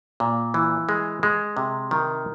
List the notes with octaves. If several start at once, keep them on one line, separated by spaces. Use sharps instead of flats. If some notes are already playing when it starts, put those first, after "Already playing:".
A#2
E3
G#3
G#3
C3
D#3